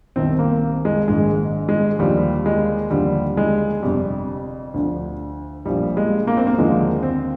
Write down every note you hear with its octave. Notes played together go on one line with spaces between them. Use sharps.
C2 C3 D#3 C4
A#3
G#3
A#1 G#2 D#3 G#3
G#3
D#2 D3 F3 G3
G#3
D#2 D3 F3 G3
G#3
G1 F2 C3 G3
D2 D3 F3
A#1 A#2 F3 G3
G#3
A#3
C4
A#3
D#2 D3 F3 G#3
C4